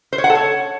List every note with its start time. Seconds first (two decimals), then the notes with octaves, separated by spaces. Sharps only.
0.13 C5
0.18 C#5
0.24 F#5
0.30 A4
0.35 C#5